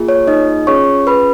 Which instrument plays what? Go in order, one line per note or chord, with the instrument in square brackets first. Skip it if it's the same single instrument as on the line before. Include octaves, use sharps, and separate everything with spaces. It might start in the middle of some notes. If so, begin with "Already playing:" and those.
Already playing: [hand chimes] A#3 F4 G#4
C#5
D#4 D#5
C#4 F4 G#4 C#5 C#6
B4 B5